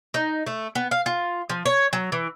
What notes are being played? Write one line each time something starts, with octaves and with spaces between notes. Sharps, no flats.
D#4
A3
B3
F5
F4
F3
C#5
F#3
E3